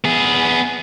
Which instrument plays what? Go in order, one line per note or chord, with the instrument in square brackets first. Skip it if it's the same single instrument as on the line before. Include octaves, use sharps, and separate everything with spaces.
[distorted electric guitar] B3 G#4